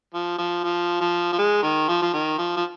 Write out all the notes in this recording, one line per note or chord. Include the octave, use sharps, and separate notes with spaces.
F3
F3
F3
F3
F3
G#3
D#3
F3
F3
D#3
F3
F3